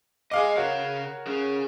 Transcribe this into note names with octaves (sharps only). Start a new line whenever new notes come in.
G#4 D#5 F5 G#5 D6
C#3 F#4 A#4 C#5 F5
C#4 G#4